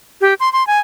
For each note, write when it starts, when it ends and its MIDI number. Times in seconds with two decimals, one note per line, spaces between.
0.21 0.34 67
0.40 0.52 84
0.53 0.66 84
0.67 0.79 80